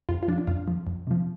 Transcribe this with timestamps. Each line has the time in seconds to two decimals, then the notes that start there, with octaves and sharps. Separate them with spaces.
0.09 F2 F4
0.23 F4
0.28 F3 D4
0.38 D4
0.47 F2 F4
0.68 F3
0.87 F2
1.07 C3 F3